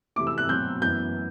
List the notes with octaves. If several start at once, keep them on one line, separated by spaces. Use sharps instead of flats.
C3 E3 A3 E4 D6
E6
F#6
B2 F#3 C4 G6
F#2 E3 B3 G6